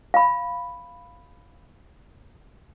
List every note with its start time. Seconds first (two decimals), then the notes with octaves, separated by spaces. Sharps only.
0.14 F5 B5